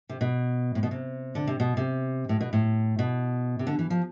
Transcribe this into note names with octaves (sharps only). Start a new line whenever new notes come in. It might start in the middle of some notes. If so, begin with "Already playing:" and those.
C3
B2
A2
B2
C3
D3
C3
B2
C3
A2
B2
A2
B2
C3
D3
E3
F3